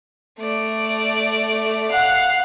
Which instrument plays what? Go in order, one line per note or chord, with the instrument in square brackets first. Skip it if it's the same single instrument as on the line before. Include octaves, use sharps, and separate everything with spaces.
[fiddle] A3 D5
[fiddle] F5 F#6 [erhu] F#5